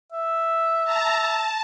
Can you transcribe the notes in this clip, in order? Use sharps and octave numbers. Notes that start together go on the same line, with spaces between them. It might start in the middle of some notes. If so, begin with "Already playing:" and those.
E5
A5 A#5
A5